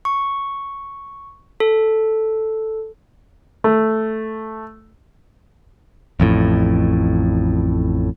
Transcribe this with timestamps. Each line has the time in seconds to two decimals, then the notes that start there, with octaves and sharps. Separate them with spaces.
0.05 C#6
1.60 A4
3.64 A3
6.20 A1 F2 A2